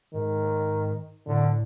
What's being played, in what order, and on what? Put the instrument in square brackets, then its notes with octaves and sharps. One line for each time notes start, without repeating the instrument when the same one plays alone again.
[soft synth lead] G#2 [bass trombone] D#3
[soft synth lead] A2 [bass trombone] D3